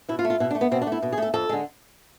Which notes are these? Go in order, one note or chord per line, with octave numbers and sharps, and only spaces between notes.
B2 E4
F4
A3
F4
B2 E4
D4
A3
B3
B2 C4
D4
A3
E4
B2
G#4
A3 A4
F2 A4
D3 G#3